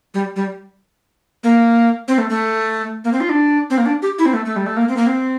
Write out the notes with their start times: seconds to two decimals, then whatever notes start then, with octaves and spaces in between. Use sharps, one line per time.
0.14 G3
0.36 G3
1.43 A#3
2.08 C4
2.18 A3
2.29 A3
3.04 A#3
3.12 C4
3.20 F4
3.29 D4
3.70 C4
3.78 A#3
3.86 D4
4.02 G4
4.18 E4
4.26 C4
4.34 A3
4.45 A3
4.56 G3
4.66 A3
4.77 A#3
4.89 C4
4.97 A#3
5.07 C4